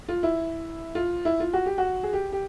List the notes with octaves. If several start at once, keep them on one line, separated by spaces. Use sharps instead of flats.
F4
E4
F4
E4
F4
F#4
G4
F#4
G#4
G4
G4